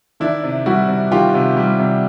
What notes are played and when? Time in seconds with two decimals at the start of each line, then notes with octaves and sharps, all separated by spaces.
0.20 D#3 D4 E4
0.43 C3
0.66 G3 E4 F#4
0.88 C3
1.12 D#3 F4 G4
1.34 C3
1.57 G3
1.79 C3